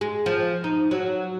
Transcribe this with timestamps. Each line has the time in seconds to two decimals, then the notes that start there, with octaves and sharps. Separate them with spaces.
0.01 G#3
0.26 F3
0.64 D#4
0.91 F#3